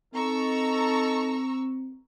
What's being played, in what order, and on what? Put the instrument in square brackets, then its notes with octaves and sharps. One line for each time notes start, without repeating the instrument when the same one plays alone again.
[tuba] C4 [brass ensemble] D#4 A4 [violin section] A#5 C#6 E6